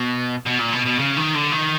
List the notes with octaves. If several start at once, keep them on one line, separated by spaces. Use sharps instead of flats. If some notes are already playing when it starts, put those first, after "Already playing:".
Already playing: B2
B2
A#2
B2
B2
C#3
D#3
D3
D#3